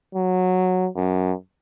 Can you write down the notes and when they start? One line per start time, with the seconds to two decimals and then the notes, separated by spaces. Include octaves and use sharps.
0.15 F#3
0.96 F#2